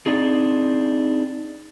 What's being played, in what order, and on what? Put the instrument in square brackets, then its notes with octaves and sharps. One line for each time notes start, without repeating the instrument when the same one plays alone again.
[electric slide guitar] C4 D4 D#4 G#4